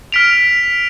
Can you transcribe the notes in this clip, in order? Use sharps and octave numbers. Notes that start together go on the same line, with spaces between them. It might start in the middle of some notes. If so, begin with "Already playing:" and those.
F6 B6 D7 F7